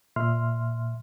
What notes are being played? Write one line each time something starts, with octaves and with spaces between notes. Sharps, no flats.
A#2 E5 C6 F6